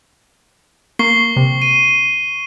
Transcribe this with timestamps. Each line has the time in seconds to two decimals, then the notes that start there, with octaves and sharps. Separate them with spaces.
0.99 A#3 C#6 C7 G7
1.36 C3
1.62 D#7